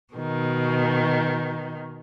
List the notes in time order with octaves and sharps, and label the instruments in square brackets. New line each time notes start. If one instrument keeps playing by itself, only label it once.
[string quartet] B2 D#3